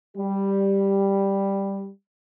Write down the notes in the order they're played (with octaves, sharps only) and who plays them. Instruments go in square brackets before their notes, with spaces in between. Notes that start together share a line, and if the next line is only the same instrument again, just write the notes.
[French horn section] G3 G4